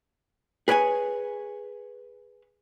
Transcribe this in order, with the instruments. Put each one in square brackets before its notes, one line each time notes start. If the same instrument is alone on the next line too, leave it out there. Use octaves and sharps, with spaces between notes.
[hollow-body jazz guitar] G#4 B4 C#5 G5 G#5